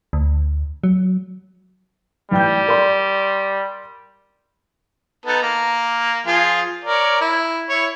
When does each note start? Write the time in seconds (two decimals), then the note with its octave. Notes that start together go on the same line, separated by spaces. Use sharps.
0.13 D2
0.84 F#3
2.31 A1 G3 G5 G6
2.68 A#4 D5 C6
5.26 B3 D#4 A4
5.42 A#3
6.27 F3 F4 G#4
6.84 A#4 C#5 D5
7.21 E4
7.69 E4 C#5